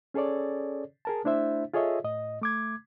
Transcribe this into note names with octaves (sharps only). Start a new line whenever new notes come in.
C#4 G#4 A4 C#5 D5
G#4 A#4 A5
A3 D4 E4 C5 E5
F4 G#4 A4 C#5 D#5 E5
A2 D#5
A3 D6 G#6